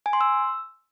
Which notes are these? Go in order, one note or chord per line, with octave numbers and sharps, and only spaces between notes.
G#5
C6
E6